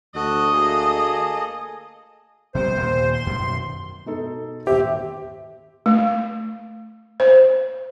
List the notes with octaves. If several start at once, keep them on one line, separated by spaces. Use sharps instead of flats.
D2 F#4 A4 D#5 F#6
A#3 G#4 A4
C3 G3 B3 C5
D#2 A#2 D#3
C6
F#2 B2 D#3
B2 D#4 A4
D#1 G4 C5 E5
A3
C5